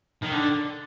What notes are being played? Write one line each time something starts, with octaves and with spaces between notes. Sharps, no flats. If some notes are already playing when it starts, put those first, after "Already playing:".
D#3
D3